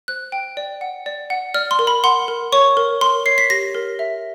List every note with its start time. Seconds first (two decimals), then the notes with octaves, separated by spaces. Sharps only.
0.08 C5 F#6
0.32 G5
0.57 D5
0.81 F#5
1.06 D5
1.30 F#5
1.54 D5 F6
1.71 C6
1.79 A#4
1.87 B5
2.04 F#5 C6
2.28 A#4
2.52 C#5 C#6
2.77 A#4
3.01 A#4 C6
3.26 C#5 C7
3.38 B6
3.50 G4 A#6
3.75 A#4
3.99 E5